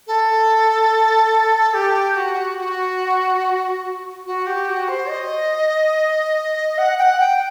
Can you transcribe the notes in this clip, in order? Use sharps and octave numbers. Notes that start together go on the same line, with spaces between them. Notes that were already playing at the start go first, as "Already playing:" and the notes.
A4
G4
F#4
F#4
F#4
G4
F#4
C5
D#5
F#5
G5
F#5
G5